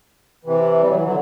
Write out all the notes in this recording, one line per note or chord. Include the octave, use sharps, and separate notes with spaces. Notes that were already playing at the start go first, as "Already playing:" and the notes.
C3 E3
G3
F#3
E3
D3 F#3